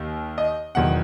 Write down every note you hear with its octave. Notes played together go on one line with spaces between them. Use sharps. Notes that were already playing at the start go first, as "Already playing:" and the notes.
Already playing: D#2 D#3
D#5
E1 E2 D#3 F#3 F#5